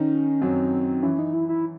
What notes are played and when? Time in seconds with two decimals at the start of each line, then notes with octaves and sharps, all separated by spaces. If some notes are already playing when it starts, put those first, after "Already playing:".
Already playing: D#3 C#4 D#4
0.42 F#2 F#3 C4
1.03 E3 C#4
1.19 D#4
1.34 E4
1.49 E4